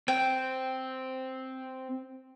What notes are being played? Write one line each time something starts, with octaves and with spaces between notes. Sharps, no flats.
C4 G5